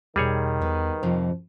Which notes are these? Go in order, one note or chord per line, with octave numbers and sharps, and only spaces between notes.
E2 B2 D#3 G3 G#4 C#5
E2 B3
F2 C3 F3 C5